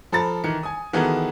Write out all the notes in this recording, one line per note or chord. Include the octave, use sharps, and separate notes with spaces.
F3 A4 A#5 B5 A6
D#3 E3 C#7
G#5 D#6
D#3 E3 B3 F#4 G#4 A4